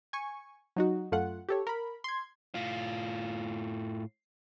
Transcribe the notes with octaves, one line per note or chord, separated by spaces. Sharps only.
G#5 C#6
F#3 D#4 F#4
F#2 A3 F4 F#5
G4 A4 C#5
A#4 B5
C6 G#6
A2 F4